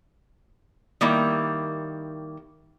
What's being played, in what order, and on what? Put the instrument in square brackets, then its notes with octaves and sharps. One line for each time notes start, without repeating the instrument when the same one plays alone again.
[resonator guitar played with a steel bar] D#3 G3 A#3 E4